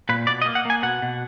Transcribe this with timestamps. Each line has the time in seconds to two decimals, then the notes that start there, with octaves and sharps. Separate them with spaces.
0.09 A#2 B4
0.27 B2 D5
0.42 D#5
0.46 A#3
0.55 F#5
0.65 A#3 G#5
0.83 B2 F#5
1.02 B2